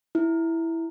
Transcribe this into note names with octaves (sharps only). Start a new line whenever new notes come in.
E4